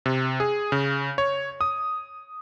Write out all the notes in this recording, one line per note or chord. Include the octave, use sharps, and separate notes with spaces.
C3
G#4
C#3
C#5
D#6